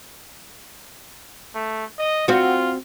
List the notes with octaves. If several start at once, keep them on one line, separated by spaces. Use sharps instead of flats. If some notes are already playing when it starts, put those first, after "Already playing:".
A3
D#5
C4 F4 F#4